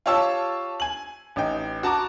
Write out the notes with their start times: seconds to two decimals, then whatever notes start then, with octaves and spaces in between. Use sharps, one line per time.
0.06 F4 G4 C#5 A5 E6
0.80 G#5 F#7
1.36 A1 D#4 G5
1.83 F#4 A5 A#5 D6